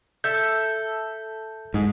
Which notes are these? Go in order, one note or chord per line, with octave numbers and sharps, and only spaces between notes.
A4 E5 G6
G#2